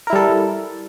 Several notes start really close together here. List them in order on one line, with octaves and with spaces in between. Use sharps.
A#4 E4 G3 A4